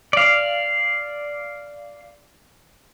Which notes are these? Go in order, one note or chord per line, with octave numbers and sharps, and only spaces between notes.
D5 F5